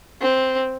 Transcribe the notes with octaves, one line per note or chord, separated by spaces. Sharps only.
C4